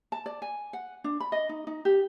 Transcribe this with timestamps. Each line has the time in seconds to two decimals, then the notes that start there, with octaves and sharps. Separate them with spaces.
0.12 A5
0.26 D5
0.42 G#5
0.73 F#5
1.04 D4
1.20 B5
1.32 D#5
1.49 D#4
1.67 D#4
1.85 G4